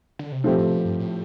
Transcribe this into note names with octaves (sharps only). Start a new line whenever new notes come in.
D3
C3
B2 F3 A3 C4 G4
A2
C3
B2
G2
A2